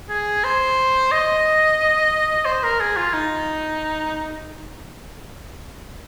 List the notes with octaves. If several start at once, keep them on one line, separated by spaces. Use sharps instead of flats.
G#4
C5
D#5
C5
A#4
G#4
F4
D#4